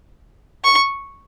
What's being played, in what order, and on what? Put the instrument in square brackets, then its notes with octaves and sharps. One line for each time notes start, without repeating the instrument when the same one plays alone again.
[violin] C#6